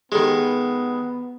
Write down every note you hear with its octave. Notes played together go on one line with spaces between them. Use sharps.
D#3 G#3 B3 G4 A4 B5